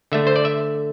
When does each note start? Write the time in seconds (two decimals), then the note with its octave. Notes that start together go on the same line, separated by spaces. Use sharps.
0.12 D3 A3 E5
0.27 C5
0.36 D5
0.45 E5